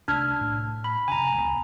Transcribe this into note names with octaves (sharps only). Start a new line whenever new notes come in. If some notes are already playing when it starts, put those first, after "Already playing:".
C2 A3 D4 F6 G#6
A2
B5
F1 C#3 G#5 A#5
C#2 G#3 B3